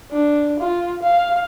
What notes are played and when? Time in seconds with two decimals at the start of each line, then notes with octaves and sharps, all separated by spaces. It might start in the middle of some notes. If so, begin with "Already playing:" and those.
0.11 D4
0.60 F4
1.03 F5